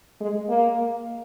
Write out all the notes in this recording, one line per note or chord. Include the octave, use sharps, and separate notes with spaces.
G#3
A#3